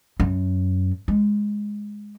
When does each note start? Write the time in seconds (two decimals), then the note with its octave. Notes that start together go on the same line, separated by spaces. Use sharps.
0.20 F#2
1.08 G#3